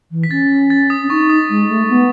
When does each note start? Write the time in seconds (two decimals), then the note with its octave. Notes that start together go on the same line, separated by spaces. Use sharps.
0.11 E3
0.23 B6
0.31 C#4 A6
0.70 A6
0.90 D#6
1.04 C#4
1.10 D#4 C#6
1.30 D#6
1.50 G#3
1.69 A3
1.89 B3